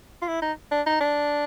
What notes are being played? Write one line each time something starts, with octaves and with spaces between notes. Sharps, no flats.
F4
E4
D#4
D4
D#4
D4